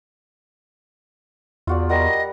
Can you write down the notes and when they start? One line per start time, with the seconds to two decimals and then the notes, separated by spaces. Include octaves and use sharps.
1.67 E2 F4 F#4 D5
1.89 G3 A#4 D#5 F#5